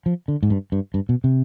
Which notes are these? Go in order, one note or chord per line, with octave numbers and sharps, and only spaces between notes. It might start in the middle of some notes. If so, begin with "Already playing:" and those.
F3
D3
G#2
G2
G2
G2
B2
C3